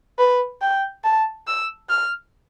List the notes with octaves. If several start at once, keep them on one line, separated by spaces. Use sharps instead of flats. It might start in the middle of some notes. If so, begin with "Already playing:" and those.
B4
G5
A5
E6
F6